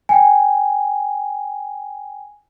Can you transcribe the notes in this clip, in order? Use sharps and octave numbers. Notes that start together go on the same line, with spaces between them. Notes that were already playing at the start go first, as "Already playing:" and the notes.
G5 G#5